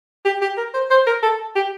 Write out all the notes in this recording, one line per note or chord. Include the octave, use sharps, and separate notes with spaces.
G4
G4
A#4
C5
C5
A#4
A4
G4